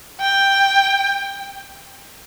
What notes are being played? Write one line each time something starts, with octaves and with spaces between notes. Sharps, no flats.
G5